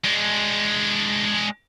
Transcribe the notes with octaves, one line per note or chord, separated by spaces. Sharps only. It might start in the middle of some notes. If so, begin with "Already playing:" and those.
G#3 D4